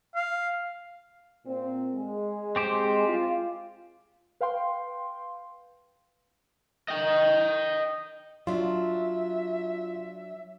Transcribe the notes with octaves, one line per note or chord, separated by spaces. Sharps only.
F5
A#2 C4
G#3
C4 G4 C5
F4
B4 F5 G5 C6
D#5 G5
F#3 D4 F4 E5